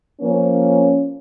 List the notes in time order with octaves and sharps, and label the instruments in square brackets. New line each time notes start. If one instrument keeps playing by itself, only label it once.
[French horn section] F3 A#3 C#4